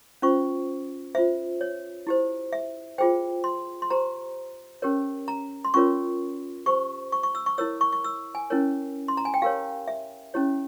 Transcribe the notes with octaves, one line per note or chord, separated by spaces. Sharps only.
C#4 F4 C5 C#6
F4 C5 E5
C#5
E4 G4 C5
E5
F4 G#4 C5 G5
C6
C6
G4 C5 A#5
C#4 G4 A#4 C#5
A#5
C6
C#4 F4 A#4 C#5 C#6
G4 C5 C#6
C#6
C#6
E6
C#6
E4 A#4 C#5 E6
C#6
C#6
E6
G#5
C#4 E4 A#4 C#5
C6
A#5
G#5
G5
G4 A#4 C#5 F5
E5
C#4 E4 G4 C#5